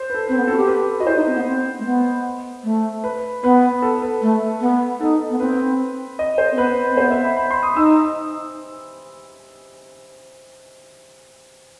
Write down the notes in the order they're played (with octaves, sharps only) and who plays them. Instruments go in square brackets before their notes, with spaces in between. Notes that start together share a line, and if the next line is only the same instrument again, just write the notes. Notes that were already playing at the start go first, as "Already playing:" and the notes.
Already playing: [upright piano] C5
B4
A4
[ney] C4 [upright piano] B4
[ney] B3
[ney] C4 [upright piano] A4
[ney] F#4
G4
[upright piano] B4
[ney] F#4 [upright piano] D#5
[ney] E4 [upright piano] C5
[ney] D#4
C4
B3
C4
A3
B3
A3
[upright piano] B4
[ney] B3 [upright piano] B4
[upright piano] A4
B4
[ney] A3
B3
[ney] D#4 [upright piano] A4
[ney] B3
[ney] C4 [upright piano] B4
[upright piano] D#5
C5
[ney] C4
[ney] B3 [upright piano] B4
[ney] C4
[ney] B3 [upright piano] C5
[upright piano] E5
B5
B5
C6
D#6
[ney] D#4 [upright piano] E6